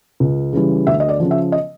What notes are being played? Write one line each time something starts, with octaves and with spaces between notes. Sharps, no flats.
C#2
C#3 E3 G3
D2 E5
D#5
D5
C#3 F3
E5
D#5